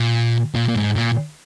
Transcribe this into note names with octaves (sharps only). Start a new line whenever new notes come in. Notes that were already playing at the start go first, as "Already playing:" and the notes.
Already playing: A#2
A#2
A#2
G#2
A#2